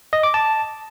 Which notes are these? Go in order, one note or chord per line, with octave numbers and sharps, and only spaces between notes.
D#5
D6
A5